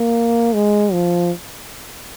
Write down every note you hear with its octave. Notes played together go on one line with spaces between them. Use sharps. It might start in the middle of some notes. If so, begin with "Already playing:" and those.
Already playing: A#3
G#3
F3